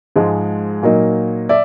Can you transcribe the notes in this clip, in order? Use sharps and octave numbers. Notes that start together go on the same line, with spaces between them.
G#2 F3 G#3
A#2 F#3 A#3 D#4
D5 E5